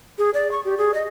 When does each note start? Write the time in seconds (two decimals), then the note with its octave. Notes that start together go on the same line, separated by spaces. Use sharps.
0.18 G#4
0.34 D5
0.51 C#6
0.65 G4
0.78 G#4
0.94 D#5